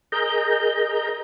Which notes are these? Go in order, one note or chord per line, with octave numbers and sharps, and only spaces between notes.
G#4 A#4 D#5 A#5 G6